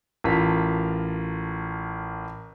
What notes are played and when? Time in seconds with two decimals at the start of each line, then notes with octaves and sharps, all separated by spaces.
0.24 A1 F4 A#4 A5 B6